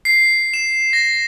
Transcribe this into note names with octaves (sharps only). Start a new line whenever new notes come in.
C7
E7
A#6